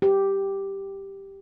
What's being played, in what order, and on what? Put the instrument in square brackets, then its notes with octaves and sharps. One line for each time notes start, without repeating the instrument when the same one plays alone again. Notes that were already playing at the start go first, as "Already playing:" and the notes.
[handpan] G4